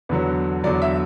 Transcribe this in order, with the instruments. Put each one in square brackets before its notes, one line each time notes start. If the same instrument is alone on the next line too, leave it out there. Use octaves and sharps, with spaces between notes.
[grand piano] E2 D3 F#3 B4
E2 D3 F#3 D5
E5